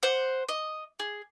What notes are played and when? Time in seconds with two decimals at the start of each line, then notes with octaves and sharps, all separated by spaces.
0.03 C5 F#5
0.49 D#5
0.99 G#4